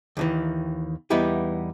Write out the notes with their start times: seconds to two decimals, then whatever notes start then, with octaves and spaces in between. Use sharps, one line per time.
0.17 D#2 D#3 E3
1.10 E2 G3 B3 D#4 E4 G4